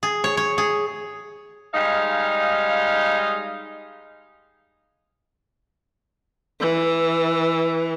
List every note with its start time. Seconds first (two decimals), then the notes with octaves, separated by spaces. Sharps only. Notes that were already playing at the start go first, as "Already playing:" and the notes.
0.03 G#4
0.24 C#5
0.37 C#5
0.58 G#4
1.74 G3 G#3 D#4 F5
6.60 E3